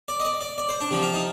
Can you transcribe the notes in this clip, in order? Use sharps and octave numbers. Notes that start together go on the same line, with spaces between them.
D5
D#5
D5
D5
D5
C5
D4
C3 F3
F4
D#4